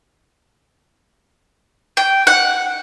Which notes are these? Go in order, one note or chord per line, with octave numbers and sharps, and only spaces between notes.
G5
F#5